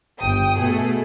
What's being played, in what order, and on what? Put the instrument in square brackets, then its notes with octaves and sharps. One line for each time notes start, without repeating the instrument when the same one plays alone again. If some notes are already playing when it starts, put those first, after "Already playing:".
[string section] G1 G5 D#6
B2 A3 G#4